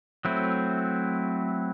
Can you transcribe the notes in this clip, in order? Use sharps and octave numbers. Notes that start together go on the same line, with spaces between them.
F#3 A3 C4 E4